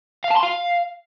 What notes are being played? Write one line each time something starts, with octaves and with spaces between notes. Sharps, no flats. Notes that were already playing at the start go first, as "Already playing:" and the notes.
F5
A5
C6
F5